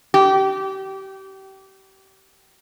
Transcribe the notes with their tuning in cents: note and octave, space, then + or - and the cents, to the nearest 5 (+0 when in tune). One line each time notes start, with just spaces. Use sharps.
G4 -30